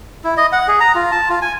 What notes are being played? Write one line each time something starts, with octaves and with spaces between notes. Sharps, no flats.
E4
D#5
F#5
G#4
A#5
F4
A5
F4
G#5